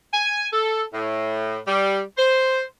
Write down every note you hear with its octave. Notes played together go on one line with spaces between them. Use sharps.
G#5
A4
A2
G3
C5